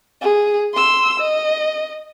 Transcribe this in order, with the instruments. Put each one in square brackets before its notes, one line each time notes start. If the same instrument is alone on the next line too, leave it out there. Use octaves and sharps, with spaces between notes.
[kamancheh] G#4
C6 E6
D#5